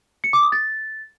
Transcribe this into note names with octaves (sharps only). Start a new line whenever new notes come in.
C#7
D6
D#6
A6